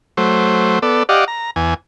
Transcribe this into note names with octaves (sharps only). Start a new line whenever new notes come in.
F#3 A3 C5
B3 A4 D5
G4 D5 D#5 F5 F#5
A#5
E2 G#5